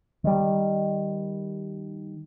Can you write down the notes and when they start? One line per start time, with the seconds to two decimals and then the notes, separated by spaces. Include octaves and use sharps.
0.24 D#3 G3